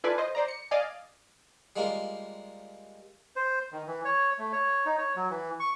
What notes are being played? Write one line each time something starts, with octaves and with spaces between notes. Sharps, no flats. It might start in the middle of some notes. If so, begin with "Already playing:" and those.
E4 F4 A4 B4 D5 G#5
C5 D#5
C5 D5 A#5
C#7
D5 D#5 F5 G#5
G3 G#3 A#3 F4
C5
D#3
E3
C#5
A3
C#5
D#4
C#5
F#3
E3
C#6